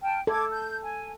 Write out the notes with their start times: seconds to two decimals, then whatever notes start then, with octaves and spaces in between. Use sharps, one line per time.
0.02 G5 A5 F6
0.27 A4 D6 G#6
0.53 G6
0.83 G#5